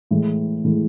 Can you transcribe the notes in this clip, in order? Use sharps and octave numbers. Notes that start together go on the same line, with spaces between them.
A2 E3 G#3
A2 E3 G#3